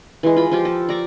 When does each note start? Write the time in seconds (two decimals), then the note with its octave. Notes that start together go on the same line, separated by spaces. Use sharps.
0.23 E3 G#3
0.37 F4 B5
0.52 F3 F4 G4
0.65 A4
0.89 D5 A#5 C#6